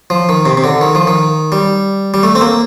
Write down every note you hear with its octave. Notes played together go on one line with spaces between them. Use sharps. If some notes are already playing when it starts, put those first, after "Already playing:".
F3
D#3
C3
C3
D3
D#3
F3
D#3
G3
G3
A3
C4
A#3